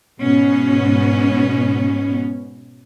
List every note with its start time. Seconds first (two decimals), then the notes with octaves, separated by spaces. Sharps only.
0.19 G#2 B2 B3 C#4